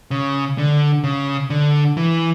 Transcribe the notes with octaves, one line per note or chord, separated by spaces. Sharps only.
C#3
D3
C#3
D3
E3